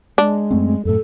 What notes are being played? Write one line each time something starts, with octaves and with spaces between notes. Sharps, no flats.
G#3 D4
F#2 A3 C4
F#2 A2 A4